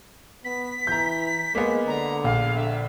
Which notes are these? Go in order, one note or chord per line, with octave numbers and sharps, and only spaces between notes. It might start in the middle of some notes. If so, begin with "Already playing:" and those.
B3 B6
E3 A#5 G6
G#3 A#3 B3
D3 A#5
A#1 F5
D3 E5